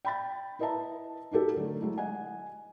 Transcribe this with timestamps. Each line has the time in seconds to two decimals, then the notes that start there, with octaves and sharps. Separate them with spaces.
0.05 G5 B5 A6
0.59 E4 B4 D#5 E5 A5 A#5
1.31 D#4 F#4 G4 A4 A#4
1.56 D3 F#3 A3
1.81 F#3 G#3 E4
1.98 D#5 F#5 G#5